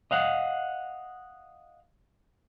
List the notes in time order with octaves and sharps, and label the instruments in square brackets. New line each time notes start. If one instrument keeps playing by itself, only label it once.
[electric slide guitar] D#5 F5 F#5